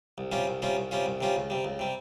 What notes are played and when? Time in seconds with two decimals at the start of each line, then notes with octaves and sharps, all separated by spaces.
0.18 C2
0.32 C3 G3 C#4 F4
0.47 C2
0.62 C3 G3 C#4 F4
0.77 C2
0.91 C3 G3 C#4 F4
1.06 C2
1.21 C3 G3 C#4 F4
1.36 C#2
1.50 C3 G3
1.65 C#2
1.79 C3 G3